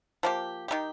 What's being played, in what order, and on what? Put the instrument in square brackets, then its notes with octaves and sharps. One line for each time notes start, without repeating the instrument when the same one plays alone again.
[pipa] F3 A#3 G4
D#3 G3 D#4 G4